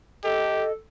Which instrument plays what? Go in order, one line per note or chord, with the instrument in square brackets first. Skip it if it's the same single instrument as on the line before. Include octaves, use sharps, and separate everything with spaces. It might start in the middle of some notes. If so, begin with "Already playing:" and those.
[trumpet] G4 [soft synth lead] A4 [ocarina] D#5